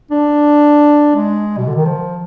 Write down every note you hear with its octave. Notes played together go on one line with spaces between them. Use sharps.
D4
G#3
B2
D3
D#3
F3